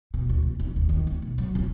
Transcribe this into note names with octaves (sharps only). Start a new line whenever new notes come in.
B2
D2
B2
F1
D#2
D#3
D2
B1
F#3
C3